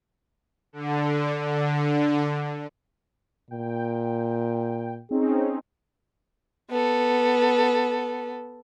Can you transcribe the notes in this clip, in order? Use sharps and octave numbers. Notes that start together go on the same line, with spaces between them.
D3
D3
A#2 G5
C4 C#4 D#4 G#4
B3 A4